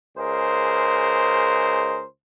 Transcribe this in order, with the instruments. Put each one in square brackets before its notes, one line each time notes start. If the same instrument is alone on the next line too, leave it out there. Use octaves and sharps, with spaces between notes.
[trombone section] C#2 G#4 A#4 C5